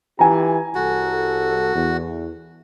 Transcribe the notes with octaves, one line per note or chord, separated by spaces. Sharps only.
E3 F4 G4 G#5 A#5
C2 F#4 A4
E2